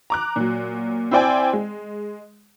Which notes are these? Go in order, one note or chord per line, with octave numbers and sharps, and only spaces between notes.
A#5 D6 F#6
A#2 F#3
C4 E4 C5 D5 G5 G#5
G#3